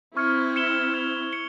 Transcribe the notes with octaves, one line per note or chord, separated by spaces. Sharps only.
C4 E4 C#6 F6 G#6 C#7
G#6 C#7 E7 G7
F6 G#6 C#7 F7
C#7 G7